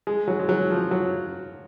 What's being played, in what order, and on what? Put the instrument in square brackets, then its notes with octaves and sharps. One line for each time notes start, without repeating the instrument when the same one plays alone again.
[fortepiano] G#3
F#3
G#3
F#3
F3
F#3